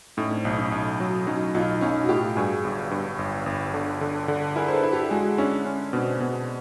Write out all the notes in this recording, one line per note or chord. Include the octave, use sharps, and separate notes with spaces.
A2 C#4 D#4
C4 D4
B1
C#4 D#4
B1
F#3
F#3 C#4 D#4
B1 D#4 F4
B1 C#4 D#4
F#4
A2 F4 G4
G2 F#4 G#4
G1
G2
G1
G1
D3
D3
D3
E4 G#4 A#4
C5
A4 B4
E4
G4 A4
G#3 F#4 G#4
C#4 D4 E4
C#4
B2 C4 D4
B2